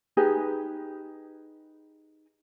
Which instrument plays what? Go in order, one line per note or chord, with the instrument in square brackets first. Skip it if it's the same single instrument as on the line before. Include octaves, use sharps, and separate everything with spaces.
[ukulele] D#4 G4 G#4 B4